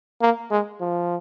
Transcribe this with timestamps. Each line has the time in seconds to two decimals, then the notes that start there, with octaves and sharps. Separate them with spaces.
0.22 A#3
0.51 G#3
0.81 F3